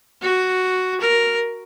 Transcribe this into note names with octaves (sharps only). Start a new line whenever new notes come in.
F#4
A#4